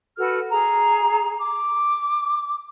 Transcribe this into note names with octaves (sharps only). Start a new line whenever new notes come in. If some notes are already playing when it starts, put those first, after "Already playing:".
F#4 A4 B4 F6
G#4 A#5
D6